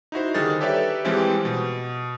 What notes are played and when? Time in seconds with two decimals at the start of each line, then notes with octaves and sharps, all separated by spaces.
0.12 D#4 E4 F#4 C5
0.34 D3 D#3 G3 D#4 G#4 A6
0.61 G4 A4 B4 C#5 D5 E5
1.05 E3 F3 G3 G#3 C4 G4
1.45 B2